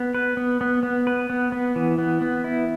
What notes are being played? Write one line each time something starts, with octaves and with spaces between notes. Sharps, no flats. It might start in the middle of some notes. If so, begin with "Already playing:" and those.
Already playing: B3
B4
B3
B3
B3
B4
B3
B3
E3
B3
B3
E4